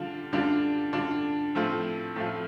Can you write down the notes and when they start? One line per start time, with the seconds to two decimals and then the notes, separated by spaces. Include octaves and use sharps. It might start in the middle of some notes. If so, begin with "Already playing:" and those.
Already playing: D3 G3 D4 F4
0.33 D3 G3 D4 F4
0.93 D3 G3 D4 F4
1.55 A2 F3 A3 C4 F4
2.16 A2 F3 A3 C4 F4